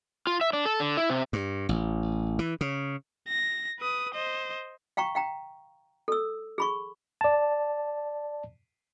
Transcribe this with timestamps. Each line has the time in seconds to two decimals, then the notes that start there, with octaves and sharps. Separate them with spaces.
0.27 F4
0.41 E5
0.53 D4
0.66 A4
0.80 D3
0.97 E4
1.10 C3
1.33 G2
1.69 A1
2.39 E3
2.61 C#3
3.29 A#6
3.79 B4 D#6
4.14 C5 D#5
4.97 F5 G5 A#5 C#6
5.15 F5 G5 A#5
6.08 A4 E6
6.58 G#4 B5 C#6
7.21 D5 A5